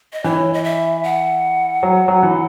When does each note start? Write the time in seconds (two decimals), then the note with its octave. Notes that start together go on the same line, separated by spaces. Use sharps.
0.13 D#5
0.24 E3 C#5
0.54 D#5
0.64 E5
1.03 F#5
1.83 F#3
2.08 F#3
2.23 E3